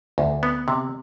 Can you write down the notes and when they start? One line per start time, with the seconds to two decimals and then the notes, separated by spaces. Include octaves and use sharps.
0.18 D2
0.43 B3
0.68 C3